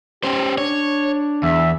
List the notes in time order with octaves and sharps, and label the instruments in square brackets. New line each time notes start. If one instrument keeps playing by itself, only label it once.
[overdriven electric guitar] C#4 C5 [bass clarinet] G4
[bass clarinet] D4 [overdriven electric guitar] C#5
[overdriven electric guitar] E2 [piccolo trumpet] E5